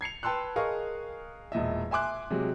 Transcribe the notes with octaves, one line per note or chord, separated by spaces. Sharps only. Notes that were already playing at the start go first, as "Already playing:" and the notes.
G#6 C7 C#7 F7
B4 G5 A5 C6 E6 F#6
G#4 A#4 D#5 F5 C#6
E1 A#2 D#5 E5
E5 G#5 C6 D6 F#6
C3 F#3 G#3